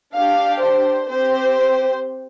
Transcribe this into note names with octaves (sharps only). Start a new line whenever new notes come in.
D4 G4 F5
C5
C4 G4 C5